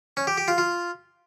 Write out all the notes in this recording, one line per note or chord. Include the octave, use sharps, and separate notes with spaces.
C#4
G4
G4
F4
F4